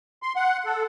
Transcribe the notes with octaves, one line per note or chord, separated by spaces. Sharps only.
C6
F#5
A4